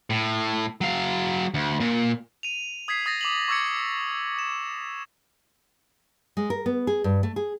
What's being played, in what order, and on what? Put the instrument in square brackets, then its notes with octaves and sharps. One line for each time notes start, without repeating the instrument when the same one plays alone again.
[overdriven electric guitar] A2
F#3 F5
D2
A#2
[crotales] D#7 F7
D#6 G#6 B6 C7
D#6 A6 A#6
D6 F7 F#7
C#6 D6 E6 G#6 C#7
E7
[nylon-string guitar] G#3
A#4
B3
G#4
G2
A3
G#4